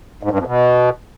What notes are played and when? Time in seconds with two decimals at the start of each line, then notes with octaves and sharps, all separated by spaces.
0.23 G#2
0.31 G2
0.39 F2
0.47 B2